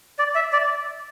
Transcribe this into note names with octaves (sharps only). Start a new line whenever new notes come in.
D5
E5
D5